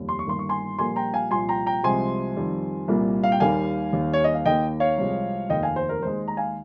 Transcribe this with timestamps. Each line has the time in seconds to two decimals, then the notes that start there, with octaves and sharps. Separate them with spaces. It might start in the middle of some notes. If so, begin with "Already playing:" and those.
Already playing: F1 D#2 G3
0.09 C6
0.19 C#6
0.27 G1 G2 D#3 A#3 C6
0.39 C#6
0.49 G#5 C6
0.79 A#1 A#2 G3 A#3 G#5 C6
0.96 G5 A#5
1.14 F5 G#5
1.31 C2 A#2 F3 G#5 C6
1.49 G5 A#5
1.66 G5 A#5
1.83 C2 C3 F3 G#3 G#5 C6
2.36 F2 D#3 G3
2.88 C2 A#2 G3 A#3
3.24 F5
3.32 G5
3.40 D#2 D#3 G3 A#3 F5 G#5
3.93 D#2 D#3 G3
4.13 C#5
4.24 D#5
4.34 F5
4.46 D#2 D#3 A#3 D#5 G5
4.80 C#5 F5
4.98 C2 C3 F3 G#3
5.50 F1 D#2 D#3 A#3 D#5 G5
5.63 F5 G#5
5.76 C5
5.89 A#4
6.02 D#2 D#3 G#3 C5
6.28 A#5
6.37 F5 G#5